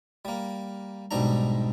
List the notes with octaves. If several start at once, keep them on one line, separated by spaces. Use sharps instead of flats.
G3 A#3
B1 G#2 G3 D4 A#5